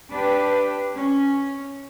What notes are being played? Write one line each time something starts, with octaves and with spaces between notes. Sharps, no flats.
D4 G4 B4
C#4